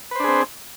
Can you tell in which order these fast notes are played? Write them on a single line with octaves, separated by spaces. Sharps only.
B4 C5 D4 G#4 C4